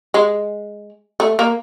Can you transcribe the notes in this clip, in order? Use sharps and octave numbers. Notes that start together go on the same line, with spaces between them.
G#3
A3
A#3